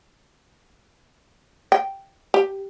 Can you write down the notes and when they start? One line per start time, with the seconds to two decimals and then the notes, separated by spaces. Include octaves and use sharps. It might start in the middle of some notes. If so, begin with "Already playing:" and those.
1.72 G5
2.34 G4